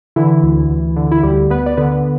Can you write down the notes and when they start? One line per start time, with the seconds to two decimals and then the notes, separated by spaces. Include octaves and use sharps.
0.16 D3 E3 E4
0.43 D2
0.70 D2
0.96 D3
1.12 E4
1.23 D2 G3 G4
1.50 D2 B3 B4
1.66 D5
1.77 D3 B3 B4